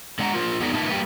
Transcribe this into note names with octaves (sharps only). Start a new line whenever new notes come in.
D3 G#3 F#5 A5 A#5
F4 A#4 C5
F2 B3 D#4 G#4 A#4 D5
A#2 D#3 D#4 E4 B4 A5
G3 A3 A#3 B4